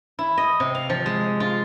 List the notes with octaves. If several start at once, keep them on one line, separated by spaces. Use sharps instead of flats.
E4
D#5
C3
F5
F3
G#3
F4